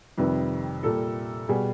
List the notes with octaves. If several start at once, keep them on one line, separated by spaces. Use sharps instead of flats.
F2 C3 D#3 G3 B4
A#2 G3 A4
B2 G3 G#4